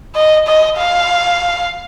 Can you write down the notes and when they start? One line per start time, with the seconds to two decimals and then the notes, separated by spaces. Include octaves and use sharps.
0.15 D#5
0.47 D#5
0.78 F5